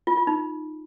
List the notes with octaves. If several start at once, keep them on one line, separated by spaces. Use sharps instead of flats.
F4
F4
D#4